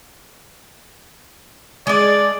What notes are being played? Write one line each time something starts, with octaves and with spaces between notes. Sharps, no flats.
G#3 D4 D5